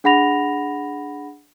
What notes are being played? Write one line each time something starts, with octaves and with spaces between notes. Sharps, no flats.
D4 G#4 F#5 B5 A#6 F7